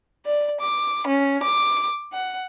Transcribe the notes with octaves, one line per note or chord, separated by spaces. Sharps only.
D5
D6
C#4
D6
F#5